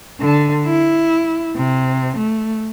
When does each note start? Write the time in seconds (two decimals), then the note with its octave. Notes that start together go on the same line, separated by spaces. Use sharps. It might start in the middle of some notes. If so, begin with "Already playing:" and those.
0.21 D3
0.66 E4
1.56 C3
2.17 A3